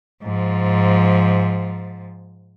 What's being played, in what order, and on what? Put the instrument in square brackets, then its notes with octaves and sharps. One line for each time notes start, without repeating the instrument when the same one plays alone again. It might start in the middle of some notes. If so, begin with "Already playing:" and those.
[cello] G#2 F3